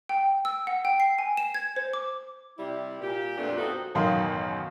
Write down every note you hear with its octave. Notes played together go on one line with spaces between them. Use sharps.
G5
E6
F#5
G5
C7
G#5
E7
G#6
C5
D6
C3 G3 E4
A#2 G4
F2 A#2 A3 B3 D4
G3 C4 D#4 F#4 A4
A1 F#2 B2 D#3 F5 C6